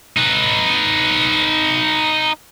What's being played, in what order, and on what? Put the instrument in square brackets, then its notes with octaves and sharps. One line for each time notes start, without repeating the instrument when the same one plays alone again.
[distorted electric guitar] D#4 B4